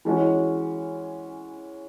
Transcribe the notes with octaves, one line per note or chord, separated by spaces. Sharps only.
E3 G#3 C#4 F#4